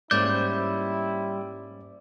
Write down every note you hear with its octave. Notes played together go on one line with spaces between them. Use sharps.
G#2 G3 A#3 C#4 E4 C5 D5 G6